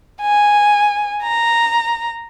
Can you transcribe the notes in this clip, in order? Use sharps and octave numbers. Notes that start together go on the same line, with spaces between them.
G#5
A#5